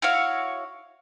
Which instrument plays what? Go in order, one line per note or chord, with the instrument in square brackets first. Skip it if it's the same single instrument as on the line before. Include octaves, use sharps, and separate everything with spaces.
[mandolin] E4 F#4 C#5 F5